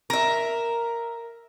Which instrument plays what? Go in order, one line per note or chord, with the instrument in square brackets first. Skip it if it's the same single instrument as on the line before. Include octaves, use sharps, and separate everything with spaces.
[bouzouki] A#4 E5